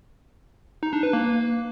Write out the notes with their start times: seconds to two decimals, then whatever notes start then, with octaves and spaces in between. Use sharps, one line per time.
0.83 D#4
0.93 D4
1.03 B4
1.13 A#3